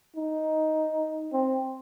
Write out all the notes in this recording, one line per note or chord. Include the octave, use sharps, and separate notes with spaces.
D#4
C4